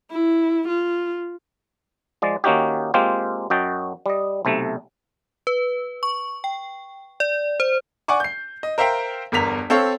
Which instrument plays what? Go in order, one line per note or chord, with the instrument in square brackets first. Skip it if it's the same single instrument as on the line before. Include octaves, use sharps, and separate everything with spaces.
[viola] E4
F4
[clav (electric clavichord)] F3 G#3 D5
D#3 A#3 C#4 D#4 F#4 G4
G#3 A#3 C4 F4 G4
F#2 F#4 D#5 G5 A5
G3 D#5
B1 C3 A3
[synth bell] B4
C#6
G5
D5
C5
[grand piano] D5 F#5 G#5 C#6 D6
G6 C7
D#5
A#4 C5 E5 F5 G5
G1 E2 A#4 B6 F7
C4 A4 C#5 F5